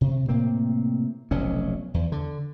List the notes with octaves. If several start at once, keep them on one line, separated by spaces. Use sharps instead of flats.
C3
A2 C3 A#3 C4
F1 B1 F#3 C#4
E2
D3